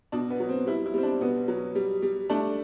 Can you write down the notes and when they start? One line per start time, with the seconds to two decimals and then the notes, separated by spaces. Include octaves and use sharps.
0.12 B2 D4
0.30 B3
0.40 F#3
0.49 C4
0.66 G3 E4
0.86 E4
0.94 G3 C4
1.03 D4
1.21 B2 B3
1.48 F#3
1.75 G3
2.02 G3
2.30 A3 D4